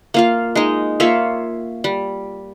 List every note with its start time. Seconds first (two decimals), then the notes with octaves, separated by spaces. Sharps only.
0.14 A#3 F4 F5
0.56 G#3 D#4
1.00 A#3 F4 C#5 E5
1.84 G3